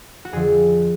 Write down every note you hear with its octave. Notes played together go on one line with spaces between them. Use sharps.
F#4
F2 D3 F3 G#4